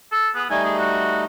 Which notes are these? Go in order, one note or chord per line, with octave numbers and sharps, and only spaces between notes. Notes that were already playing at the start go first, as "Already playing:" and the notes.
A4
B3 G#4
G3 A3 D#4 G#5
G#4
F#4